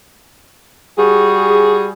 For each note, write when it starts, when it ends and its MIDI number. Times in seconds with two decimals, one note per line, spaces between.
0.97 1.92 55
0.97 1.92 66
0.97 1.92 68